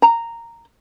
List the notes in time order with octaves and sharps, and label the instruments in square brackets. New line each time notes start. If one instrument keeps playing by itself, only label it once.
[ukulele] A#5